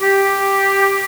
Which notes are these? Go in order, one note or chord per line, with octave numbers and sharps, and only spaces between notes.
G4